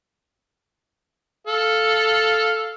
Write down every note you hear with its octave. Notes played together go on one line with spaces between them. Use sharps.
A4 F5